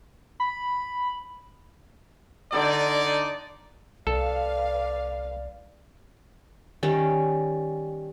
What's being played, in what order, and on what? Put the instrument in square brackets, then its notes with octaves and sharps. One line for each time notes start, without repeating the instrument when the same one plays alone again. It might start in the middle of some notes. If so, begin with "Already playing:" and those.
[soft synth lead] B5
[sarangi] D3 [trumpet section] D#4 D5
[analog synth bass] C2 [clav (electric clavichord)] A4 [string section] B4 F5 [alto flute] D5
[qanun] D#3 G3 C#4